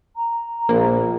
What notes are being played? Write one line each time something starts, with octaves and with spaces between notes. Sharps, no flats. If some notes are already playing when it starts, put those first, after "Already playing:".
A#5
A#1 A#3